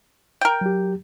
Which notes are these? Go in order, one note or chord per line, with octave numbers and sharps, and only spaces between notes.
A#4 G5
F#3 G4